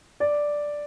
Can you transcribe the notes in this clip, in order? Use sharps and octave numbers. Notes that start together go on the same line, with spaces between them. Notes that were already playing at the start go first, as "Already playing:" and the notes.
D5